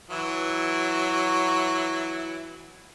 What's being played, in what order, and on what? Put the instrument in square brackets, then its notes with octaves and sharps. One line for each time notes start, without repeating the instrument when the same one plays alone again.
[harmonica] E3 F#3 E4